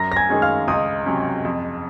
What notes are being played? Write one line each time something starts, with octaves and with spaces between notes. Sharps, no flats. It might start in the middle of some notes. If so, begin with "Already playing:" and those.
Already playing: F#2 A#5 A#6
A#6
G#5 G#6
D#3 G#3 C#4 G#4
F5 F6
C#2 D#5 D#6
C3 F#3 C#4
F2